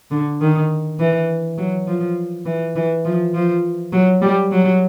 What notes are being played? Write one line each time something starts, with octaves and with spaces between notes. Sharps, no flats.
D3
D#3
E3
F#3
F3
E3
E3
F3
F3
F#3
G3
F#3